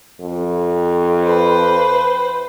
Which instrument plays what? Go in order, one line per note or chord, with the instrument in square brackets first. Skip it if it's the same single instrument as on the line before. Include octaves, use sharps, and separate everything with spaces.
[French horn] F2
[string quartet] B4 C5